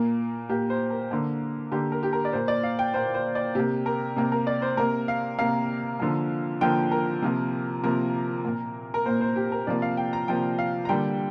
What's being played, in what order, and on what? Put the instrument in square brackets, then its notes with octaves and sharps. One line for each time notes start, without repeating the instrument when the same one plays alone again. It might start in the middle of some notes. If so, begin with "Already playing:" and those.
Already playing: [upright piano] A#2 A#3
A#2 A#3 G4
C5
A#4
D3 A#3
D3 A#3 G4
A#4
G4
A#4
D5
A#2 A#3 C5
D5
F5
G5
A#2 A#3 C5
C5
D5
C3 A#3 G4
A#4
C3 A#3
A#4
D5
C5
C3 A#3 A#4
F5
C3 A#3 F5
D3 F3 A#3
D3 F3 A#3 G5
A#4
C3 F3 A#3
C3 F3 A#3 A#4
A#2 A#3
A#4
A#2 A#3 C5
C5
G4
A#4
C3 F3 A#3 D5
F5
G5
A#5
C3 F3 A#3 G5
F5
A#5
D3 G3 A#3 G5